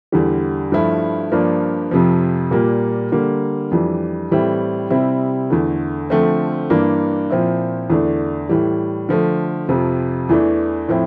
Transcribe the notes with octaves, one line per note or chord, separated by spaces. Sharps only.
E2 D3 G3
G2 F3 A3 E4
G2 F3 A#3 D4
F2 C3 F3
A#2 G3 A#3
D3 G3 A#3
F2 E3 G3 D4
A2 E3 G3 C4 E4
C3 G3 C4 E4
E2 D3 A3
D3 F3 A3 C4
G2 E3 A#3 D4
A#2 F3 C4 E4
E2 D3 A3 D4
A2 E3 G3
D3 F3 A3
F2 C3 F3
E2 E3 A3 D4
A2 F3 C4 E4